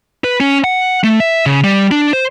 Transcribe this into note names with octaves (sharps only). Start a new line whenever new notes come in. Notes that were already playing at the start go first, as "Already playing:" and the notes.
B4
C#4
F#5
A3
E5
C#3
G3
D4
C5